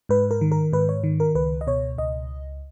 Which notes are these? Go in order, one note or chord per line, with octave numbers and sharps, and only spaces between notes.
G#2 B4
A#4
D#3
A#4
G#2 B4
C#5
D#3
A#4
C#2 B4
D#5
B2 C#5
C#2 D#5